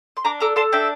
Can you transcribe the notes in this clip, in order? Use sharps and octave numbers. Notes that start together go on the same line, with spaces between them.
C6
D4 A#5 D6
A4 A#5 D6
A4 A5 C6
D4 E5 G5